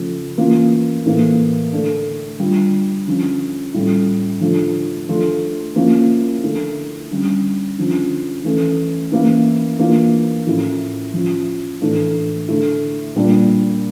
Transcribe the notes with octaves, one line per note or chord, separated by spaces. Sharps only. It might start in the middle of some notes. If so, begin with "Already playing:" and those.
Already playing: C#3 F3 A3
E3 A#3 C#4 F4
A2 E3 A#3
D3 A3 D4
D3 G3 D4 F4
D3 F3 C#4 F4
A2 G3 C#4 F4
D3 F3 A3
F3 A3 D4 F4
F3 A#3 C#4 E4
D3 A3 E4
D3 G3 C#4
D3 F3 C#4
E3 A3 C#4
E3 A#3 C#4 E4
E3 A#3 D4 F4
A2 F3 C#4 E4
F3 C#4 F4
A2 E3 A3 D4
D3 A3 E4
A#2 G3 A#3 D4